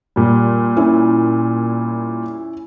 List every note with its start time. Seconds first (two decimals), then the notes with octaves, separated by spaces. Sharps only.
0.16 A#2 G3
0.77 C#4 E4